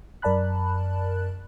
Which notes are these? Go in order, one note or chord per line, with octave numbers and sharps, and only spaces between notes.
F#2 A#4 D5 A5 B5 F#6